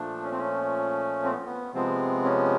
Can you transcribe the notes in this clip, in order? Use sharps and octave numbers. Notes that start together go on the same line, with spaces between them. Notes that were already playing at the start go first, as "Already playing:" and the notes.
Already playing: A#2 F3 A3 D4
C#4
C4
C#4
C4
B3
B3
C3 F3 G#3 B3 C4
C#4